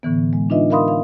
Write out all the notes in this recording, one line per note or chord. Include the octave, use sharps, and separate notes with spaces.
A2 D3 E3 B3
G#3
D4 D#4 F4 B4 D#5 E5
A#4 E5 F5 B5 C6 D#6
F5